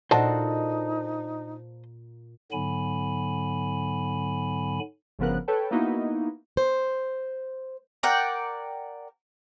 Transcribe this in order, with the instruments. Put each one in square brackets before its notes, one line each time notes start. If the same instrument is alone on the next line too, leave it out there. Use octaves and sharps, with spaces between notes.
[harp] A#2 [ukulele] D4 F#4 A4 [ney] D#4 [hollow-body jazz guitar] C5 D#5 A5
[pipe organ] G#2 D3 F#3 B3 G#5 B5
[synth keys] G1 C#3 F3 B3 A#4 F#6
A4 B4 C#5 G5 A5
A#3 B3 D#4 E4 F#4
[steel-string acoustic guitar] C5
[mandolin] A#4 D5 F#5 G5